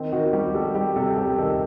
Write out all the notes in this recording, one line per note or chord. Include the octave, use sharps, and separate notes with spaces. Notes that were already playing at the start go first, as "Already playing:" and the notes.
Already playing: D#3 C4
D#3 F#4
F#4
G3 G4
G3 A4
G3 G4
C3 A4
A4
G3 G4
D#3 A4